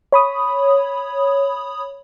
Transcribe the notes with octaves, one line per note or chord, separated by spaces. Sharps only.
C#5 B5 D#6